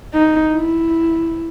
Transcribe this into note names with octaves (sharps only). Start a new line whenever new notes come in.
D#4
E4